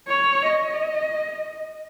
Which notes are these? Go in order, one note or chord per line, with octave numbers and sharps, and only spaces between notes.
C#5
D#5